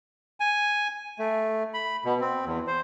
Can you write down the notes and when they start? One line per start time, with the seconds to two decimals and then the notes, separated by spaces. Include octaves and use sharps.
0.40 G#5
1.19 A3
1.74 B5
2.05 B2
2.21 C4
2.46 E2
2.67 C5